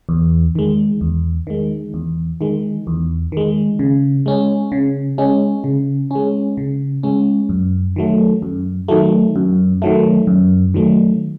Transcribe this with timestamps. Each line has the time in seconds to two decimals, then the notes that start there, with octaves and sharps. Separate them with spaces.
0.09 E2
0.55 D#3 G#3
1.01 E2
1.47 D#3 G#3
1.94 E2
2.41 D#3 G#3
2.87 E2
3.32 D#3 G#3
3.79 C#3
4.26 G#3 C#4
4.72 C#3
5.18 G#3 C#4
5.64 C#3
6.11 G#3 C#4
6.57 C#3
7.03 G#3 C#4
7.49 F#2
7.96 D#3 F#3 A3
8.42 F#2
8.88 D#3 F#3 A3
9.36 F#2
9.82 D#3 F#3 A3
10.27 F#2
10.74 D#3 F#3 A3